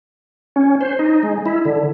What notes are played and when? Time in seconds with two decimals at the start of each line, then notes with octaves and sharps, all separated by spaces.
0.56 C#4
0.81 C5
0.99 D#4
1.23 G#3
1.46 E4
1.65 D3